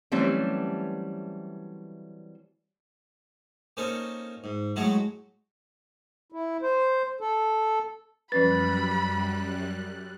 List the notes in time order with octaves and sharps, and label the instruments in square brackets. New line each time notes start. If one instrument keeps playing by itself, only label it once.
[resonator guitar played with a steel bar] E3 F#3 G3 A3 C4 C#4
[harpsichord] A#3 C4 C#4 D#4 A4
G#2
A2 F#3 G#3 A3 E4 F#4
[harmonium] E4
C5
A4
[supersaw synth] F#2 G3 F#6 [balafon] F3 C#4 B4 [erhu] B5 [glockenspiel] A6